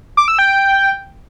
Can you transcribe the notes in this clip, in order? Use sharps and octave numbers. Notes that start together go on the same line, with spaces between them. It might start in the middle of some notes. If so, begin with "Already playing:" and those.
D6
E6
G5